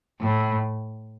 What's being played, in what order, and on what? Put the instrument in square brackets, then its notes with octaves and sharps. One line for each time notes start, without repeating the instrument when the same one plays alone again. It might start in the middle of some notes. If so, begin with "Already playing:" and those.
[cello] A2